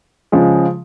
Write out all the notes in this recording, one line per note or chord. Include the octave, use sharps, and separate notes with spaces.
C#3 F3 G#3